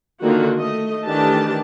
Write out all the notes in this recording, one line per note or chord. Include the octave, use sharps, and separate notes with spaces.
D3 D#3 A#3 F4 F#4
A3 D#5
D#3 E3 A3 D4 G4 A5